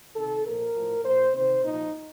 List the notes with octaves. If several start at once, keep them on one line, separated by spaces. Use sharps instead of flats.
C3 D#3 A4
A#2 F3 A#4
A2 F3
A#2 F3 C5
C3 D#3 C5
A#2 F3 D#4